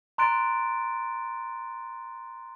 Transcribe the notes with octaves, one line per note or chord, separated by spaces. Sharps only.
A#5 C6 F#6 A6 D7